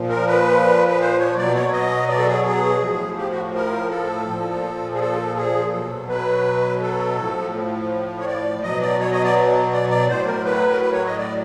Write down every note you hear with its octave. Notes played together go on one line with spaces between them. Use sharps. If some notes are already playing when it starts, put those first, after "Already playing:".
Already playing: A#2 F3
A#4
B4
B4
C5
C#5
B2 F#3 D5
C#5
D#5
D5
A4
G#4
G#4
A2 F3
G4
F#4
A#4
A4
A#2 F3
G#4
A4
G#4
B2 F#3 A4
B4
A4
A2 F3
C#5
D5
B2 F#3 D#5
D5
C#5
D#5
D5
D5
D5
A2 F#3 C5
A#4
B4
A#4
B4
C#5
D#5
D5